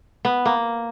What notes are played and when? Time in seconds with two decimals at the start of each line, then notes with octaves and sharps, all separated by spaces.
0.25 B3
0.45 A#3